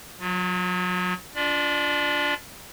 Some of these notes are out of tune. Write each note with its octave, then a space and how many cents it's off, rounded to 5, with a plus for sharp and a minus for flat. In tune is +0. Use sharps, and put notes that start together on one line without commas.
F#3 -30 F4 +35
D4 -30 F4 +0 D5 +20